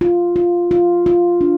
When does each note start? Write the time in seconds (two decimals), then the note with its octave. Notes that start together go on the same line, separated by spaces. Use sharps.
0.01 F4
0.36 F4
0.71 F4
1.06 F4
1.41 D4